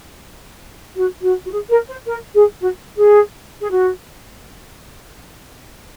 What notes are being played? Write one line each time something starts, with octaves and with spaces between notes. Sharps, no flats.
F#4
F#4
F#4
G#4
A#4
C5
A#4
G#4
F#4
G#4
G#4
F#4